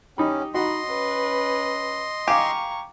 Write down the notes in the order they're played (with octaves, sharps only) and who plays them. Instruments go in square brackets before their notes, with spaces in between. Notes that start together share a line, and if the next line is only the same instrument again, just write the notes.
[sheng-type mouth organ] C#4 [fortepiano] D#4 B5 [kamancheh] G4
[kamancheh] D#4 B5 [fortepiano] F#4 [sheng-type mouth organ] D#5 C6
[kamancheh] C#4 B4
[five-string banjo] G4 [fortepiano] F5 G#5 [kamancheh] A#5 C#6